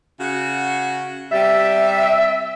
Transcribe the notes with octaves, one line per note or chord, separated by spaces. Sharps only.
C#3 F#4
C3 G3 E5